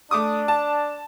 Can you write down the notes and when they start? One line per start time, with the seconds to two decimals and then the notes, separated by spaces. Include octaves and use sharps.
0.11 A3 D4 D6 D#6
0.48 A5